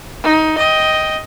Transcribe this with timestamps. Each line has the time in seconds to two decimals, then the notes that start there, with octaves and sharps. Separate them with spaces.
0.24 D#4
0.59 D#5 G5